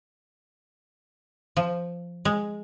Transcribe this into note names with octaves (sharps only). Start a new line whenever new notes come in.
F3
G#3